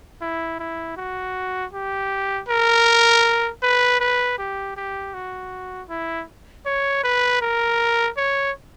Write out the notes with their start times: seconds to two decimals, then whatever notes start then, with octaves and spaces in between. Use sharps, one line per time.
0.21 E4
0.59 E4
0.97 F#4
1.73 G4
2.49 A#4
3.63 B4
4.00 B4
4.38 G4
4.77 G4
5.14 F#4
5.89 E4
6.66 C#5
7.04 B4
7.41 A#4
8.17 C#5